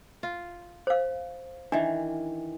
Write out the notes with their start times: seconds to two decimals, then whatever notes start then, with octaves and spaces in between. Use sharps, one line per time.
0.23 F4
0.87 C5 F5
1.72 D#3 E3 D4